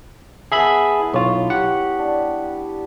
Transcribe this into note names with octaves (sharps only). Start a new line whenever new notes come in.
B3 G#4 E5 A5 B5
E4
B1 F4 C#5 D6
G4 F#5
D4